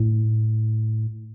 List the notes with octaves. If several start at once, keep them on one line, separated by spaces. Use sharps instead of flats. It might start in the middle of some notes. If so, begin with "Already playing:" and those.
Already playing: A2